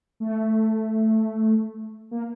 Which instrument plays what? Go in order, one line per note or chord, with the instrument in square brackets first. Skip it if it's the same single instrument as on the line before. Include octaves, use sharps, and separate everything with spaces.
[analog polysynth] A3
A#3